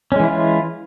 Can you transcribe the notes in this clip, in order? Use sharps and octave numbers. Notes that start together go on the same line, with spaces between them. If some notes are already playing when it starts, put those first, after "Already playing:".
E3 G#3 C#4 E4 F4